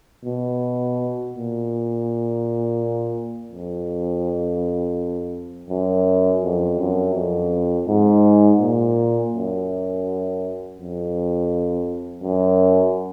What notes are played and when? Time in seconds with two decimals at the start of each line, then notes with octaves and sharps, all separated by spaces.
0.25 B2
1.34 A#2
3.52 F2
5.70 F#2
6.42 F2
6.79 F#2
7.15 F2
7.88 G#2
8.60 A#2
9.33 F#2
10.78 F2
12.23 F#2